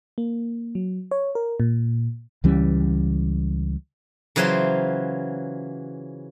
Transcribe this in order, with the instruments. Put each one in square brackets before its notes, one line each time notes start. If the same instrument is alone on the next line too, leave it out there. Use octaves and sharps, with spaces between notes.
[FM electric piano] A#3
F#3
C#5
A#4
A#2
[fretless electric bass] C#2 E3 G3 C#4
[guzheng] C#3 E3 F#3 F4 C5 C6